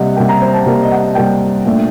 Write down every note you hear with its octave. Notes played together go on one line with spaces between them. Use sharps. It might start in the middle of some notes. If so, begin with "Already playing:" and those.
Already playing: C3 G3 A#3 D#5 F#5
C3 G3 A#3 G5
A#5
C5
A5
C3 G3 A#3
D#5
F#5
C3 G3 A#3 G5
A#2 A3 D4